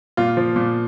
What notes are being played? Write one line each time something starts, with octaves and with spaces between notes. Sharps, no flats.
A#2 F4
F3
A#2